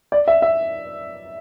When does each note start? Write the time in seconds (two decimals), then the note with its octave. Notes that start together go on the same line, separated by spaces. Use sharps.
0.12 D5
0.28 E5
0.42 E5